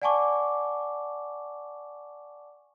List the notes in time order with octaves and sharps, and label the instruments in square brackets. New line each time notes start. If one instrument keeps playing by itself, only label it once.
[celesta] D5 F#5 G#5 A5 C#6 D6